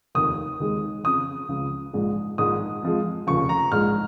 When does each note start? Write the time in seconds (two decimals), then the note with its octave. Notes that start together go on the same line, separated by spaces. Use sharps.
0.15 F1 D#2 D#3 D#6
0.60 D#2 D#3 G#3
1.04 F2 C#3 F3 D#6
1.48 C#2 C#3 F3
1.93 A#1 G#2 G#3
2.38 A#1 G#2 D#3 G#3 D#6
2.83 F2 F3 G#3
3.27 F1 D#2 C#3 F3 C#6
3.49 A#5
3.72 A#1 G#2 G#3 F6